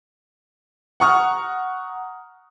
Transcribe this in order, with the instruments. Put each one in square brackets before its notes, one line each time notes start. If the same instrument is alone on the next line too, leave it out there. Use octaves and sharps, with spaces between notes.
[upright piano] F#5 A#5 C#6 D#6 F6